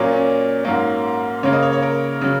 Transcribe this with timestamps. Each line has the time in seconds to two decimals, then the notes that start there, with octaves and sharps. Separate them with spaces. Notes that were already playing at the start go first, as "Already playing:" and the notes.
Already playing: A#2 F#3 A#3 C#4
0.12 C#4
0.64 G#2 F#3 A#3 C#4
1.43 C#3 A#3 C#5
1.53 D#5
1.63 C#5
1.73 C#5
1.83 A#4
2.21 C#3 F#3